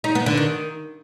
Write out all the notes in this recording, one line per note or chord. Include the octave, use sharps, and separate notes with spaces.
D#4
B3
D3
D#3